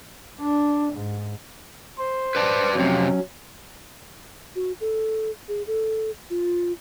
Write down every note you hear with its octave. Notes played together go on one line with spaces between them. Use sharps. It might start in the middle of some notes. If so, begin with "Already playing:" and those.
D4
G#2
C5
B4 D5 A5
F2 C3 F#3 C#4
F#4
A4
G#4
A4
F4